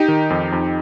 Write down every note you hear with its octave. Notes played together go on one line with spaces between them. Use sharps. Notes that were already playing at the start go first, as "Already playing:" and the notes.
Already playing: D#4 G4
D#3
F2
F2